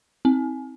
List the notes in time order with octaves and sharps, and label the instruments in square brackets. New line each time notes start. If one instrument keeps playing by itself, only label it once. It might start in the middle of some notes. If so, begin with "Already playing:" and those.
[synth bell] C4